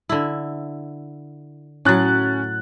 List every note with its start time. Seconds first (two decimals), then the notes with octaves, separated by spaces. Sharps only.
0.09 D3 E4
1.85 A2 F#3 C#4 F#6 A6